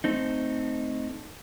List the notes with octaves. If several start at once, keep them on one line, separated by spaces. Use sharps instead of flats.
A3 C4 D#4